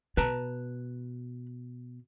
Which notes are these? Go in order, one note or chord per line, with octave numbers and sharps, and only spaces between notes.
B2 B4 A5 A#5